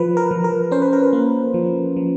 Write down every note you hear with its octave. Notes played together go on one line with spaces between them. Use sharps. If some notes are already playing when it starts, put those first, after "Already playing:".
Already playing: F3 B4
A#4
F3
A#4
C#4 C5
B4
A#4
B4
A#3
F3
F3